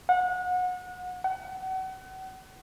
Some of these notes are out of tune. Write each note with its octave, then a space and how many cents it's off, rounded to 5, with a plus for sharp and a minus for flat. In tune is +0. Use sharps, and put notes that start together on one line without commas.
F#5 -30
F#5 +35